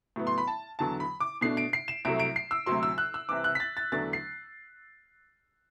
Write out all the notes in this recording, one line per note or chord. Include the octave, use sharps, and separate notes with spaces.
A2 F#3 B3
C6
B5
A5
E2 D3 F#3 A5
B5
D6
B2 A3 D4 C7
D7
C7
E7
C2 C3 F#3 A3 D7
D7
C7
E6
D2 C3 F#3 C6
E6
F#6
E6
C2 C3 E3 D6
F#6
B6
A6
A6
E2 D3 F#3 A3 D4 A6
C7